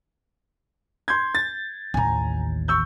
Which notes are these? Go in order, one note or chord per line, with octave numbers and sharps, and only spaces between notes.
C6 G6 G#6
A6
A1 D#2 G#5 A#5
C#6 E6 G6